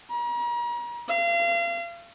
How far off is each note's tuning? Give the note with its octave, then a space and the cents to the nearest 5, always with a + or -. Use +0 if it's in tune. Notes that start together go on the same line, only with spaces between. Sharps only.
A#5 +40
F5 -35